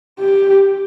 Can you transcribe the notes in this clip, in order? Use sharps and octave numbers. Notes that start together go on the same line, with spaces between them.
G4